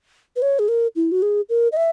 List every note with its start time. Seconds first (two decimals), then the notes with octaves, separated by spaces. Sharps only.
0.36 B4
0.42 C#5
0.59 G#4
0.68 A#4
0.96 E4
1.12 F#4
1.22 G#4
1.49 A#4
1.72 D#5
1.77 E5